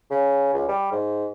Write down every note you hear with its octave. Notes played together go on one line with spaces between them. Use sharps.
C#3
C#2
G3
G#2